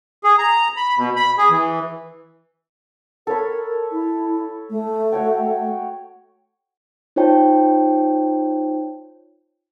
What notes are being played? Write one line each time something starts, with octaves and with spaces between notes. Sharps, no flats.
G#4
A#5
B5
B2
B5
G#4
E3
A4 A#4 C#5 B5
E4
A3
F#4 C#5 G5
D#4 F4 C5 C#5 G5 A5